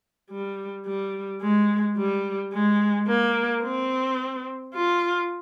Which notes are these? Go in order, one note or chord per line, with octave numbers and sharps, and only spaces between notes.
G3
G3
G#3
G3
G#3
A#3
C4
F4